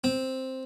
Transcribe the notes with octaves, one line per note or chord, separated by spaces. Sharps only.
C4